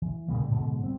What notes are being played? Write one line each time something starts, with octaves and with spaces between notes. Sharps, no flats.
E3
A#2 C#3 G3 A#3
G#2 B2 D3 F#3
G3 C4